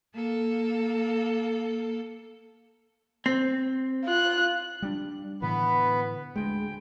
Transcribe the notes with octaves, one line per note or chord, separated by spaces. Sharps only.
A#3 A4
C4
F4 F#6
G3 D4
A2 D3 E3 B3 B4
D2 G#3 G5